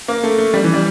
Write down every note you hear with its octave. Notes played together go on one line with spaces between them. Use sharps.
A#3
A3
A3
G3
E3
G3